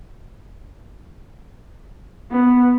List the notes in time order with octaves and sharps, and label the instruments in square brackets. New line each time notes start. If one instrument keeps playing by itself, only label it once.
[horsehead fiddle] B3